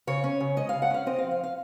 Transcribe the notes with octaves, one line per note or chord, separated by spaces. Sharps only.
C#3 C#5
C#4
C#3
G#3 D#5
C#3 F5
F#5
C#4 F5
C4 D#5
F5
F3
F5
F5